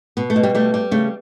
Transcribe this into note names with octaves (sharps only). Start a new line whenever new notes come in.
B2 B3
A3
B2
G3
G3 A3
G3
C#3 A3